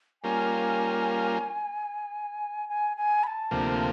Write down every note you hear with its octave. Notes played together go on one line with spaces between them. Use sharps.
G3 A#3 C#4 F4 A#4 G#5
G#5
G#5
B5
A5
D2 C3 F3 A#3